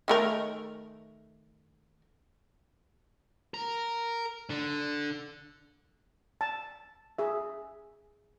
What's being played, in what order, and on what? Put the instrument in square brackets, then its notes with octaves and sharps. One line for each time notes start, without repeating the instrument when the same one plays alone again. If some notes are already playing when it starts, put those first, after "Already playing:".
[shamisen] D#3 A3 A#4
[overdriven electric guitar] A#4
D3
[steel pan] A5
G#4 E5